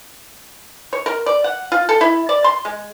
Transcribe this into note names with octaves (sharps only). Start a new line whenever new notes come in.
C#5
A#4
D5
F#5
F4
A4
E4
D5
C6
G#3